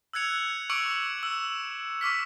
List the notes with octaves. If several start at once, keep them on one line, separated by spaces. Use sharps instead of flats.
E6 F#6 G#6 C#7 F7
C#6 D6 E6 C#7 D7 F#7
E6 E7
C#6 D6 F6 B6